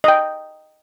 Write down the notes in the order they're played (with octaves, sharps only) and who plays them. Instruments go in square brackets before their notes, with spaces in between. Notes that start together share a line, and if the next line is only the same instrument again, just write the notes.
[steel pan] D#5 G5